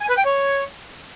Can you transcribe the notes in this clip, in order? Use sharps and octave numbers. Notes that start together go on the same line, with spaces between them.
G#5
B4
G5
C#5